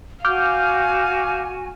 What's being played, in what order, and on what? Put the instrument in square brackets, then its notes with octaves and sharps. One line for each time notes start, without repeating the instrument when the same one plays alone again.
[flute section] F#4 G#5 [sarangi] F5 [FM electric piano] D6 F6 G6